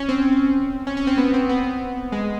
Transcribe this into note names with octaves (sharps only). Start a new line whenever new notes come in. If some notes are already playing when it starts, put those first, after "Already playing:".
Already playing: C#4
C4
C#4
C#4
C4
B3
C4
B3
G#3